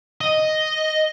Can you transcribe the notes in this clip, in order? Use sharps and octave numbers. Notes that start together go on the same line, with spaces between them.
D#5